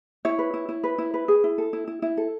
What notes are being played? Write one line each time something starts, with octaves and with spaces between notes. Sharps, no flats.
E4 C#5
B4
E4
E4
B4
E4
B4
G#4
E4
A4
E4
E4
E4
A4